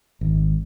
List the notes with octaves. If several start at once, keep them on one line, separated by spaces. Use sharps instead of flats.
G#1